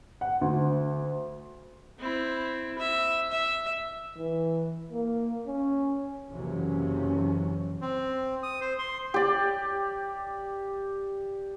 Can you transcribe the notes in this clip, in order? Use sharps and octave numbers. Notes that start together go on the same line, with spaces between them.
F#5
D2
C4 E4
E5
E5
E3
A#3
C#4
F#1 C3 E3 C#4
C4
D#6
C5
C6
G4 D5